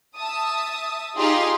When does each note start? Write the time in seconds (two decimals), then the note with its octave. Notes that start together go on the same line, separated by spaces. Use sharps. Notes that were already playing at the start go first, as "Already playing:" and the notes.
0.16 E5 A5 D#6
1.18 D#4 F4 G4 G#4 A#5 C6